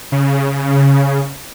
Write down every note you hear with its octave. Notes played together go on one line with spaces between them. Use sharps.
C#3